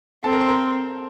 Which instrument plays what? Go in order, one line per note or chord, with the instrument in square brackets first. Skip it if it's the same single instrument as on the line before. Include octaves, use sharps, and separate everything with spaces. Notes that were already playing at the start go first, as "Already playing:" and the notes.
[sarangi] C4 [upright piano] A4 A5
[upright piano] A#4 A#5
C5 C6
A#4 A#5